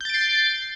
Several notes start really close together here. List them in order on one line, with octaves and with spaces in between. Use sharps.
G6 A6 D7 C7